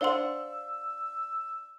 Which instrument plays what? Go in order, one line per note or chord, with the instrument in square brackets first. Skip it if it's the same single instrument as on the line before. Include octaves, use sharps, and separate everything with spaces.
[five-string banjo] D4 F5 F#5 [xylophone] C5 C6 [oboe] E6